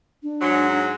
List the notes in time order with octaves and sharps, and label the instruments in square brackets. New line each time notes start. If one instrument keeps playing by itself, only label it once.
[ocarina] D4
[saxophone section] G#2 F#3